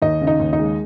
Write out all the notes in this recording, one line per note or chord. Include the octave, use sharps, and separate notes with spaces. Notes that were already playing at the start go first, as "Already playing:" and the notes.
D#2 D#4 D#5
C#3
D#4 D#5
D#2
D#4 D#5
G#3